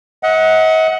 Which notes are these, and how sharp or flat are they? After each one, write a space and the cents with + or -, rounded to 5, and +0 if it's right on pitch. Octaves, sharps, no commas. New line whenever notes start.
D#5 +40 F#5 +0